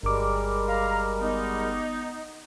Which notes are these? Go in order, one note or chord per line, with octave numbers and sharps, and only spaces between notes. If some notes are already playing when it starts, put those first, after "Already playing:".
G1 G3 G#3 A#4 D6
F5 A#5
B3 D#4